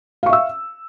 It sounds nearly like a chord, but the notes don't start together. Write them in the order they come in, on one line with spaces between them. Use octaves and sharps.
F5 C#6 E5 E6